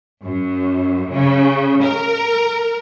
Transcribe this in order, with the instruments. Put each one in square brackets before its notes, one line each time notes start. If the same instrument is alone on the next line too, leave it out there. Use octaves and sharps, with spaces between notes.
[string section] F#2
C#3
A#4